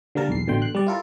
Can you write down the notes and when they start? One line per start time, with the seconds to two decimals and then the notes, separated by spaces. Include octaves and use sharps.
0.15 D3 G3 A#3 A#4 A5
0.28 B1 E2 C7
0.47 A1 B2 D3 A3 G5 C6
0.62 F#6
0.74 G3 D5
0.87 E4 F4 A4 A#4